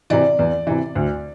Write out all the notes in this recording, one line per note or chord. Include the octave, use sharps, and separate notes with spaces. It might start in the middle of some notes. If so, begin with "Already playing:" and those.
C3 E3 D5
E2
C3 E3
D2